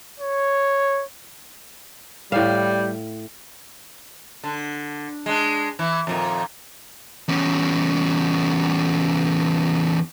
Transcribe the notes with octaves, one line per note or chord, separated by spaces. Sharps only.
C#5
A2 G3 F5
D3
G#3 D4
E3 E4
F2 A#2 D#3
E2 C#4